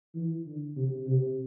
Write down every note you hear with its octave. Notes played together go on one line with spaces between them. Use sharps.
E3
D3
C3
C3